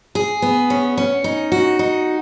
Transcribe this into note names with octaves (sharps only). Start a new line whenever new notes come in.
G#4
B3
C#4
C#4
D#4
F#4
D#4